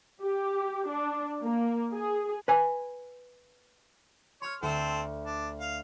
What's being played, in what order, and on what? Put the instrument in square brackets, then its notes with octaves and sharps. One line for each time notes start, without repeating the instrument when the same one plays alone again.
[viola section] G4
D4
A#3
G#4
[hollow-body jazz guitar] B4 G#5
[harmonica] C#5 [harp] C6 F6
[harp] D2 [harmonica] C4 A4 C5
[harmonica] D4
F5